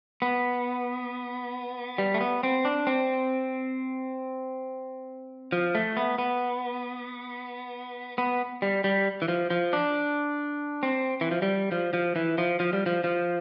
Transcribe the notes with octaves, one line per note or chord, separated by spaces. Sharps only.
B3
G3
A3
B3
C4
D4
C4
F3
A3
B3
B3
B3
G3
G3
E3
F3
F3
D4
C4
E3
F3
G3
F3
F3
E3
F3
F3
G3
F3
F3